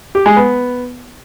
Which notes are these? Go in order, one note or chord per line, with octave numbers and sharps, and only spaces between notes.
G4
G#3
B3